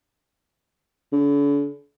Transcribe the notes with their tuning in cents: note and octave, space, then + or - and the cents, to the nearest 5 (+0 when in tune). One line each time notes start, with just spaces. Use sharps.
D3 -45